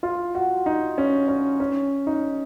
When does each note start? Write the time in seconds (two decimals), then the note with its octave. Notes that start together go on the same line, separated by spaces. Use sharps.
0.03 F4
0.35 F#4
0.66 D#4
0.98 C#4
1.28 C#4
1.60 C#4
2.07 D#4